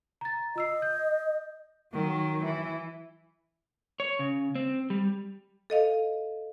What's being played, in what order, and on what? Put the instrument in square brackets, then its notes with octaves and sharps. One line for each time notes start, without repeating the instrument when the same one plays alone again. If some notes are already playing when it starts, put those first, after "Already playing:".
[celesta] A#5 A6
[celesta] F4 E6 C7 [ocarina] D#5
[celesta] G6
[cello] D#3 F#3
E3
[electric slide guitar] C#5
C#3
C4
G3
[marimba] A4 D#5 F5